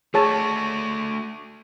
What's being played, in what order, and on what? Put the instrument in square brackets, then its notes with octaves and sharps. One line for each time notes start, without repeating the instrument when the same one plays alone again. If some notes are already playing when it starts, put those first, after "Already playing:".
[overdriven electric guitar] A3 F#4 [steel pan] G#4 C#5 A5